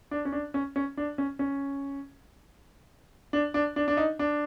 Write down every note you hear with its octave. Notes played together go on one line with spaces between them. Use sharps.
D4
C#4
D4
C#4
C#4
D4
C#4
C#4
D4
D4
D4
D4
D#4
D4